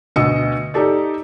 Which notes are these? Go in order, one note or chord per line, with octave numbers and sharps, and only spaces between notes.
D2 B2 B3 D#5 E6 C#7
D#4 G4 A4 D5